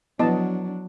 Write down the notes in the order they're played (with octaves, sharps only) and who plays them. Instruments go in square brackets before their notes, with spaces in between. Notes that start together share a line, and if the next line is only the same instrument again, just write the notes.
[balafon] F3 E4 [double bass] F#3 D4 [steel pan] B3 D#5 A5